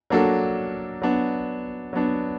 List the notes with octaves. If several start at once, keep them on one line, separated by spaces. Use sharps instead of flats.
F#3 A#3 D4 F#4 A4
F#3 B3 D4
F#3 B3 D4